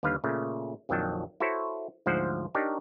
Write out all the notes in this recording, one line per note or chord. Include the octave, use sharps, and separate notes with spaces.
D#2 D3 G3 B4 F5
A#2 C#3 A3
A#1 F2 D#3 F#3 G5 A5
E4 F#4 A4 C5 C#5
D2 G#2 F3 F#3 C5 F#5
D4 D#4 G4 A#4 C#5